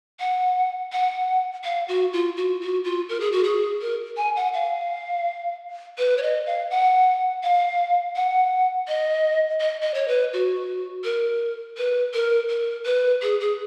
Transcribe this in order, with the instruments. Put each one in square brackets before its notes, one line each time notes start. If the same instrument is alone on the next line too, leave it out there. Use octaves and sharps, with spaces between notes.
[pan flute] F#5
F#5
F5
F#4
F4
F#4
F#4
F4
A#4
G#4
F#4
G#4
A#4
G#5
F#5
F5
B4
C#5
D#5
F5
F#5
F5
F#5
D#5
D#5
D#5
C#5
B4
F#4
A#4
B4
A#4
A#4
B4
G#4
G#4